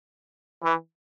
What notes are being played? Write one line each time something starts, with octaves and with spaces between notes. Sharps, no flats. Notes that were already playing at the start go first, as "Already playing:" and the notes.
E3